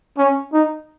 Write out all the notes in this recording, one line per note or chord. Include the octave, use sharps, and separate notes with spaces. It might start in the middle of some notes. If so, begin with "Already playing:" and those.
C#4
D#4